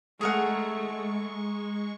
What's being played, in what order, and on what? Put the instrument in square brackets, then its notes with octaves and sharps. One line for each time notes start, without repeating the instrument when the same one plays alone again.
[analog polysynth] G#3 C#6 [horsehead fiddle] A3 [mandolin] G#4 A#4 F#5